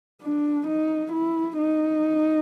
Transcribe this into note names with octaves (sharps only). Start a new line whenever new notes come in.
D4
D#4
E4
D#4